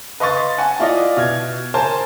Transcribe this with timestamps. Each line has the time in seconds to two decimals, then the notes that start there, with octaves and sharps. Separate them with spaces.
0.20 B4 D#5 F5 C6 C#6 A6
0.58 F#5 G#5 A5
0.79 E4 F4 D5 D#5
1.17 B2 F6 G#6
1.74 A#4 C5 G#5 A5 C6